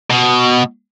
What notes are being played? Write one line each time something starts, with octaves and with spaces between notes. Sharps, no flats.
B2